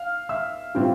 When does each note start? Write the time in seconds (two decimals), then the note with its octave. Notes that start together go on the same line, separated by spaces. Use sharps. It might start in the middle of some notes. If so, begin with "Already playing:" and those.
Already playing: F5 F6
0.29 E5 E6
0.75 A2 E3 G3 C4 F4